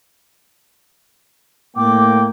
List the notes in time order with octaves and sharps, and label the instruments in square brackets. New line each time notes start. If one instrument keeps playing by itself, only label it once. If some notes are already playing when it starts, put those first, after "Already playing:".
[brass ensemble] A2 A#3 G5 [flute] D6